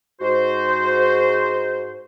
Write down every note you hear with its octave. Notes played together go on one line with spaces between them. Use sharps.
G#2 F#4 C5